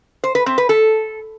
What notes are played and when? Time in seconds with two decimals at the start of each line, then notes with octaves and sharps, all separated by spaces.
0.24 C5
0.35 B4
0.46 C4
0.58 B4
0.69 A4